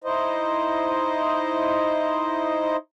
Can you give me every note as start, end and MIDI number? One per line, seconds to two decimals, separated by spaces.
0.04 2.76 63
0.04 2.76 64
0.04 2.76 72
0.04 2.76 75